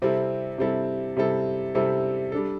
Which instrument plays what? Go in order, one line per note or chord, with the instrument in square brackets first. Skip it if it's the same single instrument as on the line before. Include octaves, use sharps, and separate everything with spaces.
[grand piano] C3 G3 C4 E4 A4
C3 G3 C4 E4 A4
C3 G3 C4 E4 A4
C3 G3 C4 E4 A4
G3 D4 A4